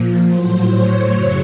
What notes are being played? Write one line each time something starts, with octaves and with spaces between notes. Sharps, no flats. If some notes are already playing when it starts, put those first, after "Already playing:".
Already playing: A#2 F3
A2 F#3 C5
C#5
F#2 C#3 F#3